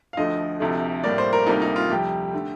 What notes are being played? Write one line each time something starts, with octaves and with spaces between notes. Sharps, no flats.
F5
D2 D3 F3 A3 D#5
D2 C3 F3 A3
A2 G3 A#3 D5
C5
A#4
D2 C3 G3 A#3 D#4
D#4
F4
F2 C3 G3 G4
D3 A3